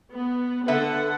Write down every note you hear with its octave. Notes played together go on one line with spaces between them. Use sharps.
B3
D3 A4 B4 E5 F#5